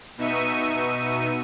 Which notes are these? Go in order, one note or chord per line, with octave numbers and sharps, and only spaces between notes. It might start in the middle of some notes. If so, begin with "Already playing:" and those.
B2 B3 D#4 E5 C#6 D#7